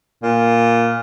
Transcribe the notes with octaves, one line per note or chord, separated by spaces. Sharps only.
A#2